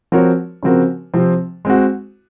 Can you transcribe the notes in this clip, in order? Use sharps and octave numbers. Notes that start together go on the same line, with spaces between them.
F3 C4 F#4 A#4 C#5
C#3 F3 C4 F#4 A#4
C3 F3 C4
G#3 C4 F#4